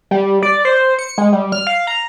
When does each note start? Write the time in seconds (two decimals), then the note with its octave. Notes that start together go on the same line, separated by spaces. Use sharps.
0.11 G3
0.43 D5
0.65 C5
0.99 C#7
1.18 G#3
1.33 G3
1.52 F6
1.67 F5
1.87 A#5